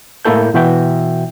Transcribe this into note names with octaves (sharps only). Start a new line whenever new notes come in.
A2 G#3 A#3 E4 A4 G6
B2 E3 F#4 E5 G5